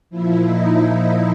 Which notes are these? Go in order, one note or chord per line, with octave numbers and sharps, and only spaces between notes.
A#2 F3 E4
D#4